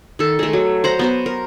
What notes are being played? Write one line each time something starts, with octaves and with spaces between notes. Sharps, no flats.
D#3 A4
G#3 A3
F#3
C5 F#5 A#5
B3 F#4 C5
A#4